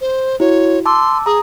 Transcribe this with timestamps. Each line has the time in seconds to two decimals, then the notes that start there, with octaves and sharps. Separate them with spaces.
0.01 C5
0.40 E4 F#4 C#5
0.86 A5 C6 D6 E6
1.26 G#4 A#5 D#6